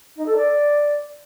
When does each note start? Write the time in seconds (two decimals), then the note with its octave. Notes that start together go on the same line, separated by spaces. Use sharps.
0.16 D#4
0.26 A4
0.36 D5